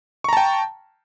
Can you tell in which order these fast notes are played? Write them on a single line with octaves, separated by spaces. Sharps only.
C#6 A#5 A5 G5